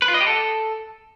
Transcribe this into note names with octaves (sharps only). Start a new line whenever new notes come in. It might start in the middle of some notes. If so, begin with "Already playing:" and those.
B4
F4
D#5
G4
A4